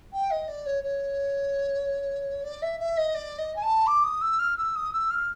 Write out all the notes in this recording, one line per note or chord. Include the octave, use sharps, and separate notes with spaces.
G5
D#5
D5
C#5
C#5
D5
E5
E5
D#5
D5
D#5
G#5
A5
D6
D#6
E6
F6
E6
D#6
E6
F6